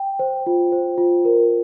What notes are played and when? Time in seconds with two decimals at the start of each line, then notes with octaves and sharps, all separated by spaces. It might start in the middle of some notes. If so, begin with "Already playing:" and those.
Already playing: G5
0.19 C5
0.47 F4
0.72 C5
0.98 F4
1.25 A#4